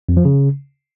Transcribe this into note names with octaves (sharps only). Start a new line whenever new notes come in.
F2
F3
C#3